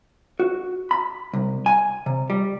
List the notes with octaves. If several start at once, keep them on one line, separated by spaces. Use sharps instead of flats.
F#4
B5
C2
G#5
C3
G3